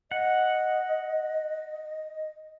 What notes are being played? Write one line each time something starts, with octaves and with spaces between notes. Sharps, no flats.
D#5 F#5